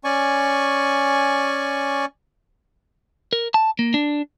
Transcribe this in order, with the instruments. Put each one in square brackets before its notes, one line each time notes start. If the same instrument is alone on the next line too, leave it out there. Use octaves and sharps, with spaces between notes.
[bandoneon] C#4 D5 G#5 C#6
[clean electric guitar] A#4
A5
A#3
D4